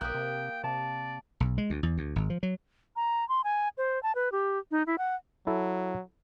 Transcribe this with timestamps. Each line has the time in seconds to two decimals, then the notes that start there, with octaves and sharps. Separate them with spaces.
0.01 B1 A#3 G4 G5 D#6 F#6
0.15 C3
0.64 C3 D5 A5
1.40 B1
1.58 G#3
1.70 D2
1.83 E2
1.98 D2
2.16 G#1
2.30 F3
2.43 F#3
2.96 A#5
3.29 C6
3.44 G#5
3.78 C5
4.03 A5
4.15 B4
4.32 G4
4.71 D#4
4.87 E4
4.98 F#5
5.47 F#3 E4 A4